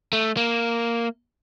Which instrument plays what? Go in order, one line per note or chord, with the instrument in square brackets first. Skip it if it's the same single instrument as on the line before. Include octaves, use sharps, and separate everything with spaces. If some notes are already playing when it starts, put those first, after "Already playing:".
[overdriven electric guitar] A3
A#3